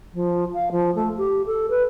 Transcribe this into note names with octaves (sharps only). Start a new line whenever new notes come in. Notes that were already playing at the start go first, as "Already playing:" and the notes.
F3
F5
F3
A3
G4
A4
B4